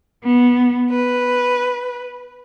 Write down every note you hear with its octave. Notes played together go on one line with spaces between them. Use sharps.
B3
B4